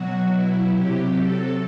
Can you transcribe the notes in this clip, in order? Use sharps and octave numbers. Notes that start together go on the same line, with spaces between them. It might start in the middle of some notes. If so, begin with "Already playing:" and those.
Already playing: B2 F#3 F#4
E4
C3 F#3 G4
A4